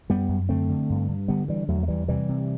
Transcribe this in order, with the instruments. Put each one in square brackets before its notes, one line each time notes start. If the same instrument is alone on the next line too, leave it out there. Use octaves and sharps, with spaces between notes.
[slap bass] F#2 G3 B3
F#2
D3 A3 C4
D3
G2
G2
D3 G3 B3
D3 E3 G3
E2 F#3 A3
A3
E2 E3 G3
C3 E3 G3
C3